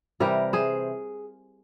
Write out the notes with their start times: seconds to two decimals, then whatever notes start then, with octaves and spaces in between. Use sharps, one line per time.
0.20 C3 E3 G3 G4 A#4
0.53 G#4 C5